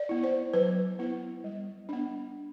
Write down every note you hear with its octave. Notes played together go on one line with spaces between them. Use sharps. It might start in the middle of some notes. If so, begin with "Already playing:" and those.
Already playing: D5
B3 E4
C5
F#3 B4
B3 E4
G3
B3 D4